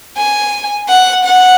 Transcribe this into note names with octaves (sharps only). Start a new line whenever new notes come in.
G#5
F#5
F#5